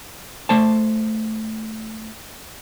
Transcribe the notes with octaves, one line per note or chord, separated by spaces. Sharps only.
A3 C5 A5